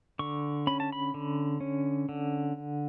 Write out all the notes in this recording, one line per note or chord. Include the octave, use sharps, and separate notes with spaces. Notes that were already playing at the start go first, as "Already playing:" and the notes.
D3 C#6
C#4 B5
A5
B5
D3
C#4
D3